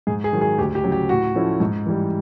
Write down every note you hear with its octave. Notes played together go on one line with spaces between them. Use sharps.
G#2 G#4
G#4
D#3 F#3
G#4
D2 G4
G4
C#3 F#3
G4
A2 F#4
F3 A3 C#4 E4
G#2
E3 G3